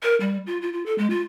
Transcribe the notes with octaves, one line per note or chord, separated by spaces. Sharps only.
A#4
G3
F4
F4
F4
A4
G#3
F4